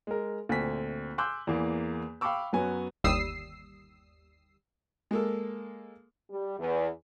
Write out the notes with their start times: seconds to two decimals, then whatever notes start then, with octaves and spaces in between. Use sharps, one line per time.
0.07 G#3 A#4
0.49 D2 A#2 C4 G#5 B6
1.18 G#5 C6 D6 E6 F#6 G6
1.47 E2 E3 A#3
2.21 F5 G5 B5 C#6 D6 E6
2.53 F#2 F#3 B3 F#4 G#5
3.04 G1 D#2 G3 D#6 E6 C7
5.11 G#3 A#3 A4
6.29 G3
6.58 E2